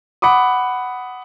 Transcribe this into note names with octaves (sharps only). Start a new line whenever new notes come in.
F#5 B5 D6 D#6